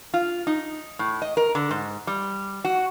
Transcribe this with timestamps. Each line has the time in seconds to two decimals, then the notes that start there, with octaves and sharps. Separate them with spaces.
0.14 F4
0.47 D#4
0.99 A2
1.22 D#5
1.37 A#4
1.55 D3
1.71 G#2
2.07 G3
2.65 F#4